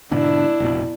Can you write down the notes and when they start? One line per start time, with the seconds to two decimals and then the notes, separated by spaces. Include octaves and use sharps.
0.11 G#2 B2 D3 D4 E4
0.60 F1 A#1 B2